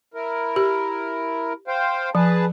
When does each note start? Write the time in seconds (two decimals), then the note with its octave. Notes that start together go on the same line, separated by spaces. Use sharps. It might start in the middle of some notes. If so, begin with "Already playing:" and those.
0.14 E4 A#4
0.56 G4
1.68 C5 F5 G5
2.15 F3 G#4 B4 A5